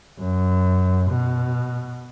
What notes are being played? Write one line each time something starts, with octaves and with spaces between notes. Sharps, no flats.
F#2
B2